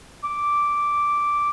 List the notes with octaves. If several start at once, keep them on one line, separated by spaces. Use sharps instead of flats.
D6